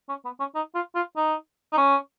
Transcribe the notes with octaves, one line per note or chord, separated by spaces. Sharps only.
C#4
B3
C#4
D#4
F4
F4
D#4
D#4
C#4